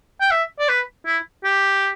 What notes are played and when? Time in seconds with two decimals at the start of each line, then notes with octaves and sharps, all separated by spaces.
0.21 G5
0.31 E5
0.59 D5
0.69 B4
1.06 E4
1.44 G4